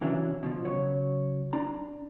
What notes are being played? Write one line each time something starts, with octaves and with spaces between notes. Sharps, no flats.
C3 E3 F#3 C#4 D4 E5
B2 E3 F3
C#3 F#3 C#5
D4 A#5